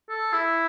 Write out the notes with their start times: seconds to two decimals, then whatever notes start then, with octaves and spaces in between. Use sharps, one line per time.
0.10 A4
0.34 E4